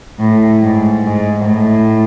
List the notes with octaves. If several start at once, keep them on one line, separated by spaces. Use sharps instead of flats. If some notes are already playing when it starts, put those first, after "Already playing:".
A2
G#2
G#2
A2